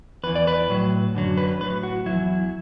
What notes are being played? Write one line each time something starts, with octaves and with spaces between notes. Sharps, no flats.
E2 E3 B4
D5
B4
A2 F#3
F#2 D3 F#3
B4
A2 F#3 B4
F#4
E2 B2 F#3 E4